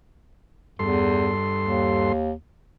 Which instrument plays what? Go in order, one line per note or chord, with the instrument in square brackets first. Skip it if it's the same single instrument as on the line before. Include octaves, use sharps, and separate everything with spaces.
[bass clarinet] E2 [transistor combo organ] G2 A4 C6
[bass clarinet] D#2